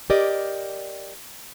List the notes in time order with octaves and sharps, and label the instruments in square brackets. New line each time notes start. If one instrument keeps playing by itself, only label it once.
[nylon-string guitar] G4 A#4 D5 D#5